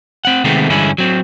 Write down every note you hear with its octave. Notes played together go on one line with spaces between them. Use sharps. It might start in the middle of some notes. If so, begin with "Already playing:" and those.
C4 F#5
C3 D#3 G#3 A3 B3 C4
G2 D3 E3 G#3 C#4 E4
F#3 C4